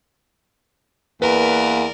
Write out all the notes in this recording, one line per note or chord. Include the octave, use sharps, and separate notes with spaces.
E2 A#3 A#4 B4 D5